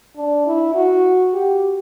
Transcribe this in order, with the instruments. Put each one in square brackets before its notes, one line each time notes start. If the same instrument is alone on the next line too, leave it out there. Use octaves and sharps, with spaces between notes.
[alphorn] D4
E4
F#4
G4